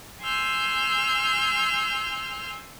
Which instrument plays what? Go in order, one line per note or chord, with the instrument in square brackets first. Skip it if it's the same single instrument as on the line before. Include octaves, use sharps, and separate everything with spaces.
[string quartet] G#5 C6 E6 F6 G6